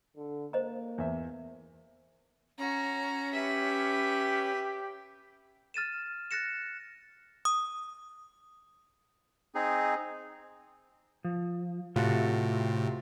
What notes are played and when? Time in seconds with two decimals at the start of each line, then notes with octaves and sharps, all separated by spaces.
0.17 D3
0.53 A#3 C5 D#5 A#5
0.98 E2 E5
2.58 C#4 F#4 A#5
3.33 G4 B4 E5
5.74 F6 A6 D#7 E7
6.31 F#6 A6 A#6 C#7 E7
7.45 D#6
9.55 C4 D#4 G#4
11.25 F3
11.96 A2 C3 F4 F#4 A4